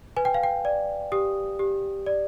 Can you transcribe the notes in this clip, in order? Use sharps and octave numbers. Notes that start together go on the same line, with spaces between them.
B4 G#5
G5
F5
G5
D5
G4 D#6
G4
D5